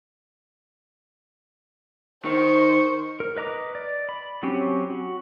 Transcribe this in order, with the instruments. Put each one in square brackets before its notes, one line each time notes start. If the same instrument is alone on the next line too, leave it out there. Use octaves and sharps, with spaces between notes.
[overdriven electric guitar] D#3 [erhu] C5 [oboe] C#6
[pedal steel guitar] A#4
B4 D#5 A#5 D6
D5
B5
F#3 C4 C#4 G4
F#4